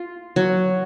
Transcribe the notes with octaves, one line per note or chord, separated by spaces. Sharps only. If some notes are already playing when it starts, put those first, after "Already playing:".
Already playing: F4
F#3